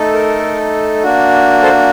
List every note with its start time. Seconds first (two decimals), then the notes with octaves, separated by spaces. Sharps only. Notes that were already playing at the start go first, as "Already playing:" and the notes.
Already playing: A3 D#4 A4
0.14 A#4
1.03 A#3 D4 F#4
1.63 A4 C5